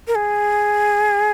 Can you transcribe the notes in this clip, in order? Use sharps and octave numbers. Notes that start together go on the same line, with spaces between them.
A#4
G#4